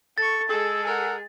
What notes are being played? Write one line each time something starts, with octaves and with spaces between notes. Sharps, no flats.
A4 C#6 A6
G#3 G#4 A4
A4 A#4 F#5